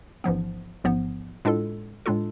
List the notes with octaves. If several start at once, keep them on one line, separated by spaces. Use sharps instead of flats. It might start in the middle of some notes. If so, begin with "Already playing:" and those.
A1 G#2 F3 B3
A1 G#2 F3 B3
A2 G#3 D4 F4 A4
A2 G#3 D4 F4 A4